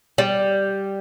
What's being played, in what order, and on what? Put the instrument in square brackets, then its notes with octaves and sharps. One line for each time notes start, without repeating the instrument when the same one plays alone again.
[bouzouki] G3